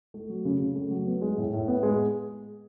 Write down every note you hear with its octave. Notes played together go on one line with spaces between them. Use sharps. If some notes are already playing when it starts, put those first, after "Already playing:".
A3
F#3
C#3
C#3
A3
F#3
B3
G#3
A2
A2
B3
G#3